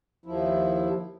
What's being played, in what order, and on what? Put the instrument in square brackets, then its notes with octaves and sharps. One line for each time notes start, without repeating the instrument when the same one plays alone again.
[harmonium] D#2 F3 E4